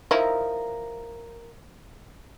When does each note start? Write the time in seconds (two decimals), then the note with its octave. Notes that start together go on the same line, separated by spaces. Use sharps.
0.11 F3 D#4 E4 A#4